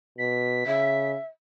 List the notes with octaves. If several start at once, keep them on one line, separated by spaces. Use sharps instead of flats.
B2 B6
C#3 E5